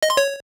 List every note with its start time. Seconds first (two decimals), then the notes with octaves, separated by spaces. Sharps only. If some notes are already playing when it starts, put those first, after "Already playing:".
0.03 D#5
0.10 C6
0.17 C#5